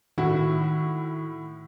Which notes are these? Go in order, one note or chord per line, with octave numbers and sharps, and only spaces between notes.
A2 D#3 E4 F#4